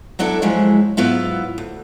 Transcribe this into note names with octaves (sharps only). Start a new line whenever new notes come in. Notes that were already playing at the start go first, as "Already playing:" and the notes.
F#3 B3 D4 E4 A4
G#2 F3 F#3 G#3 E4
G#2 F#3 B3 E4 F4
D2